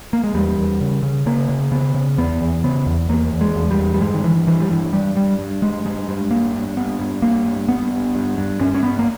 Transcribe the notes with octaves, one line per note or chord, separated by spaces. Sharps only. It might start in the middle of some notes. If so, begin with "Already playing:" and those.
A#3
G#3
E2 G3
E2
C#3
C#3
C#3 A#3
C#3
C#3 B3
C#3
E2 B3
E2
C#3 B3
E2
E2 A#3
E2
G#3
E2
G3
E2
G3
G2 G#3
D#3
G2 E3
G2 E3
G3
G2 E3
G2 G3
G2 G3
G2
G2 G#3
G2 G#3
G2
G2 A#3
G2
G2 B3
G2
G2 A#3
G2
G2 B3
G2
G2
G2
G2 C#4
C#4
G2 B3
A#3